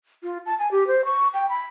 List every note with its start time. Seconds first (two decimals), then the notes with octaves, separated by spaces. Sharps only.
0.23 F4
0.46 A5
0.59 G#5
0.71 G4
0.87 C5
1.05 C#6
1.34 G5
1.49 B5